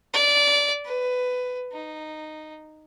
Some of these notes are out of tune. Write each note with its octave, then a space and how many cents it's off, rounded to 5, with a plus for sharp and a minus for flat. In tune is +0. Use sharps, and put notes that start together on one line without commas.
D5 -20
B4 +15
D#4 -10